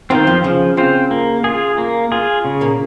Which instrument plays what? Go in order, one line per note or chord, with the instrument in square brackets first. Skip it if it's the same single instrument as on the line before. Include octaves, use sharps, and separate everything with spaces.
[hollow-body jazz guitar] D#3 [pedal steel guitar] C4 F4 C5
[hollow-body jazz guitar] F2 F3
[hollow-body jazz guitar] C#3 [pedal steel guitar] F3
[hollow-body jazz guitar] C#3 [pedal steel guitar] C4 F4 C5
[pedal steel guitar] A#3
F4 G#4
A#3
F4 G#4
C#3
[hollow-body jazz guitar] A#2 A#3